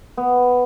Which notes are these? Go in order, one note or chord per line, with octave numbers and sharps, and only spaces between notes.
B3